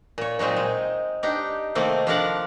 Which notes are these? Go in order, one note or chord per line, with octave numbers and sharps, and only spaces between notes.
A#2 C#5
A#2 F#3 G#3 C4 D#4
G#3
D4 D#4 G4
C3 D#3 A3 A#3 C4
F3 D4 A4 A#4 D5 F#5